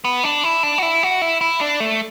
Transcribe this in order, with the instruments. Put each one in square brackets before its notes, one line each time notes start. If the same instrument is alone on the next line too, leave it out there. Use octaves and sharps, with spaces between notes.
[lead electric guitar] B3
D4
E4
D4
F#4
E4
F#4
E4
E4
D4
A3